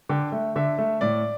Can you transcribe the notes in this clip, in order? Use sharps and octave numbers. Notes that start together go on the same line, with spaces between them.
D3 G5
A3
D3 E5
A3
A2 D5